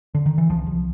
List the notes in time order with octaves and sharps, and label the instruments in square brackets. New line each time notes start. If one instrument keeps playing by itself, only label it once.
[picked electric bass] D3
D#3
E3
C2 F3
C2